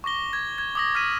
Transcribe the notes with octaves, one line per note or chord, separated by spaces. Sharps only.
C#6 D6 A#6 G7
G#6
G#6
D6 D#6 A#6
F6 G#6 B6 D#7